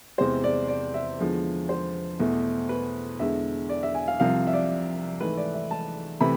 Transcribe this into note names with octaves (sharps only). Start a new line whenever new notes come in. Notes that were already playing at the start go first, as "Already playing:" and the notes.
E2 C3 G#3 C5
D5
D5
E5
E2 D3 F3 G#3
C5
E2 B2 A3
B4
E2 D3 G#3 E5
D5
E5
G#5
F5
C2 C3 F3 F5
E5
D5
G#2 E3 A3 B4
D5
E5
A5
C3 E3 A3 B5